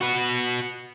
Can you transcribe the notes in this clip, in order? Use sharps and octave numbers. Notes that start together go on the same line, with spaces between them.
F#4 B4